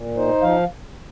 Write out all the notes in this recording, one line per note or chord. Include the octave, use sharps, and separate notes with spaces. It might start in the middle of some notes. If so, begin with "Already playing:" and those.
Already playing: A#2
D#4 C5
F3 F5